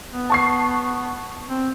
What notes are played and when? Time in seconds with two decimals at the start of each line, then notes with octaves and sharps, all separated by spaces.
0.10 B3
0.30 A5 C#6 C7
1.48 C4